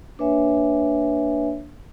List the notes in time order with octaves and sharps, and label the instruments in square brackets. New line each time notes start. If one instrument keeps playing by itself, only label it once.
[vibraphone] A#3 D4 B4 C#5 E5 G#5